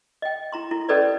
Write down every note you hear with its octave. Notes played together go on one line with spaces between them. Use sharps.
D#5 G5
E4 A#5 C6
E4
C#4 G4 A4 B4 D5 D#5